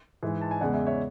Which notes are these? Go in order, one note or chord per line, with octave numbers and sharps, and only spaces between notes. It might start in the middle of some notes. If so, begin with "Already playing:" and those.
G#2 E3 G#3
A5
G#5
E2 C#3 G#3 D5 F#5
E5 G#5
C#5 E5